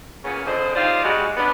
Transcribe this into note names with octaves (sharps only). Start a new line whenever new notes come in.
A#2 C#3 B3 C#4
F2 D3 C4 G#4 C5 D#5
D#4 F4 G4 C5 D5 F5
G3 G#3 C#4 D#4 F#4
B3 C#4 D4